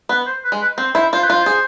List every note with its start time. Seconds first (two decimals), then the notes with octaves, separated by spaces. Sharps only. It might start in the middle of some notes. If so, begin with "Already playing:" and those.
0.09 B3 B4
0.26 C5
0.44 B4
0.52 G#3
0.61 B4
0.77 C4 C5
0.94 E4 C5
1.13 F4 C5
1.23 B4
1.30 F4 C5
1.46 G#4